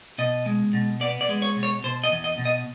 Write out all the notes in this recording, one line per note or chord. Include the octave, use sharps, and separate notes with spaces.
B2 D#5
G#3
B2
B3 D5
D5
G#3
C#5
B2
C#5
B2 C5
D#5
E2
D#5
B2
D#5